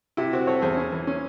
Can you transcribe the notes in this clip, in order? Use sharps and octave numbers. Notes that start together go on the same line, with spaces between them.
C3 E4
C4 F#4
C4 A4 C#5
E2 G#4 C5
C#4
E3
C#4